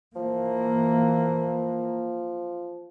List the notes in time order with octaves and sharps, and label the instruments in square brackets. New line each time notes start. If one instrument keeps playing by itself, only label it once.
[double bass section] E3 A#3 [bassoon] F3